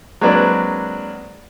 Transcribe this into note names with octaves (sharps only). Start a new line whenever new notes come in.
F#3 G#3 A#3 C4 D4 B4